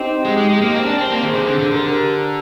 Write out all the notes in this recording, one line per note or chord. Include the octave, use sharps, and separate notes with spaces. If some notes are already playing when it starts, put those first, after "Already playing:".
Already playing: C4 D#4 G4
G#3
G#3
G#3
A#3
C4 G4 A#4
D4
C4
A#3
D#3 G#4 C5
C3
D3
D3
D3 G4 A#4